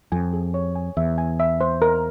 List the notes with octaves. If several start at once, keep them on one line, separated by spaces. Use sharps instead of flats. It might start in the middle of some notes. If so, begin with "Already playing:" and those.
F2 G#5
G#4
C#5
G#5
E2 E5
G#5
E5
C5
A#4